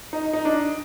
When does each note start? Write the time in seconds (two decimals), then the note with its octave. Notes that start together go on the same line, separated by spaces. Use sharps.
0.13 D#4
0.33 D#4
0.45 D4